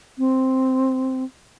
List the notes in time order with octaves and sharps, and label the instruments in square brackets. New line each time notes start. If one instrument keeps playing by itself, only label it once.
[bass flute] C4